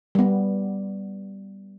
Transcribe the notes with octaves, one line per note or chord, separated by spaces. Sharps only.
G3 B3